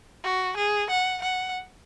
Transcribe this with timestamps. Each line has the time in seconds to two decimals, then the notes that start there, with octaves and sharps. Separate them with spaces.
0.24 F#4
0.56 G#4
0.90 F#5
1.22 F#5